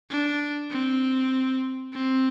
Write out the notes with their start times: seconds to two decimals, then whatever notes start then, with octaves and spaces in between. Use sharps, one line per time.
0.10 D4
0.71 C4
1.93 C4